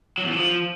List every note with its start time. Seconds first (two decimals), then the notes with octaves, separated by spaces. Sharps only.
0.18 F#3
0.24 E2
0.30 E3
0.37 F3